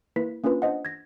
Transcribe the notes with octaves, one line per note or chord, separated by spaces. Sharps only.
A#3 E4 B4 B6
A#3 C#4 D4 F4 B4
D4 C5 D#5 F#5
G#6 A#6